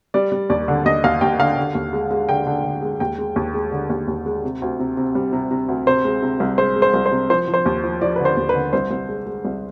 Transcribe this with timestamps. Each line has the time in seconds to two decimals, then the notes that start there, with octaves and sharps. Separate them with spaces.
0.14 G3 D5
0.32 G3
0.50 D#2 D5
0.68 D3
0.85 D#2 D#5
1.04 D#2 F5
1.21 D#2 G5
1.39 D3 F5
1.57 D3
1.75 D#2
1.93 G#3
2.11 G#3
2.29 D3 G5
2.47 D3
2.64 D3
2.82 G#3
3.00 D#2 G5
3.19 G#3
3.36 D#2
3.54 G#3
3.72 D3
3.90 D#2
4.08 D#2
4.26 G#3
4.44 C3
4.62 D2
4.80 C3
4.97 C3
5.15 G3
5.33 C3
5.51 C3
5.68 D2
5.87 C3 C5
6.05 G#3
6.22 C3
6.40 C2
6.58 G#3 C5
6.76 G#3
6.82 C5
6.94 C2
7.06 C5
7.12 C3
7.30 F3 C5
7.48 F3
7.54 C5
7.66 D#2
7.83 F3
8.01 F3 D5
8.16 D3 B4
8.25 C5
8.37 D#2
8.49 B4
8.55 D3
8.73 C2 C5
8.91 C2
9.09 G#3
9.26 G#3
9.45 C2